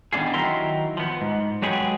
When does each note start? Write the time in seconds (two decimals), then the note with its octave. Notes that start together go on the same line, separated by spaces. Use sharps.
0.13 D#3 G3 B3 D4 F4 G#4
0.34 D#3 F#3 E4 G4 A#4 C6
0.97 F3 B3
1.21 G#2
1.62 F#3 G#3 G4 G#4 B4 F#5